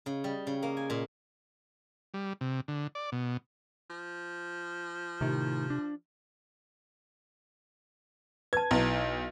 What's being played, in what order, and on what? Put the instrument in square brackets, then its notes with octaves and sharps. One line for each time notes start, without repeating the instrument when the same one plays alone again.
[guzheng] C#3
G3
C#3
A#3
G#5
A#2
[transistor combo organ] G3
C3
D3
D5
B2
[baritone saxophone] F3
[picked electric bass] A2 D#3 [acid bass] C3
[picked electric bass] D4
[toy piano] B4 A5 [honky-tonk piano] G#6
[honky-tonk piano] B1 [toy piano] E4 B4